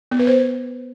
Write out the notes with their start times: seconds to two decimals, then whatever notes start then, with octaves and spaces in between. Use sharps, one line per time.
0.11 B3
0.19 B4
0.27 C5